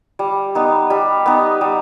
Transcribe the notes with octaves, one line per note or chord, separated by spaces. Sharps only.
G3
B3 D#4
G3
B3 D#4
G3